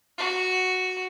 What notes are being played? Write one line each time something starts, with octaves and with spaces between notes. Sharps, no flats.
F#4